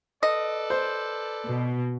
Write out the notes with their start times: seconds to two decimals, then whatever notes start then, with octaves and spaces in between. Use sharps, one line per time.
0.23 A4 B4 D5 D#5
0.70 C5
1.47 B2